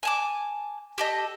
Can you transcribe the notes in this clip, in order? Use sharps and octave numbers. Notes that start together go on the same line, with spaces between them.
G#5 A5 D6
G4 A4 D#5